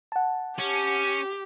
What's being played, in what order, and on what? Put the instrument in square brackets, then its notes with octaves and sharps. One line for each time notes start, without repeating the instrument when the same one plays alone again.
[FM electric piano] F#5 A5
[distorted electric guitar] C#4 [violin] G4